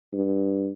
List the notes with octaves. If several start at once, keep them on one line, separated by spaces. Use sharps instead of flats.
G2